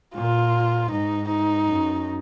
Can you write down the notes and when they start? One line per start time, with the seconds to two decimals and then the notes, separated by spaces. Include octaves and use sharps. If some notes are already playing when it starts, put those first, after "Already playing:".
0.15 A#2 F4
0.91 G#2 D#4
1.28 D#4
1.67 F#2